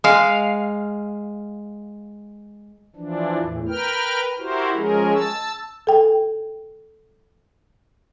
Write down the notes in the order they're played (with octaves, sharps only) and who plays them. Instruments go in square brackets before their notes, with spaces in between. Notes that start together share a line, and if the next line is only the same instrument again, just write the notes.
[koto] G#3 F5
[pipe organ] E3 F3 D4
E2 A2 E3
A#4 B4 G5 F6
E4 F#4 G4 A#4 C5
F3 G#3 C#4 G#4 A#4
A5 E6
[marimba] A4 G5